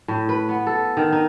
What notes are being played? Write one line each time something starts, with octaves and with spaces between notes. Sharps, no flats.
A2
B4
B3
A4
D#3
D#4